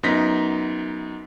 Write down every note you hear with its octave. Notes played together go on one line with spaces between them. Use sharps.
F#2 B3 D#4 A#6 B6